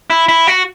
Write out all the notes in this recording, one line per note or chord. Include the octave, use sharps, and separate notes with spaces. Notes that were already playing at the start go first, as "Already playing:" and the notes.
E4
E4
F#4